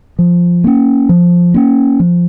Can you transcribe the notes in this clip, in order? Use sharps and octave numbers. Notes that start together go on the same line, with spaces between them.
F3
A#3 C#4
F3
A#3 C#4
F3